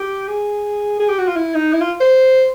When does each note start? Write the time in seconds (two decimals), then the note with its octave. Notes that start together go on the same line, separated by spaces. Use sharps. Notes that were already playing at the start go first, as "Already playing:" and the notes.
Already playing: G4
0.28 G#4
0.99 G#4
1.09 G4
1.19 F#4
1.27 F4
1.36 E4
1.54 D#4
1.73 E4
1.81 F4
2.00 C5